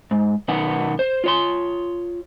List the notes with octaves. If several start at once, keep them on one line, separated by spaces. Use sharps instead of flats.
G#2
B1 D#3 B3 F#5
C5
F4 C#5 C6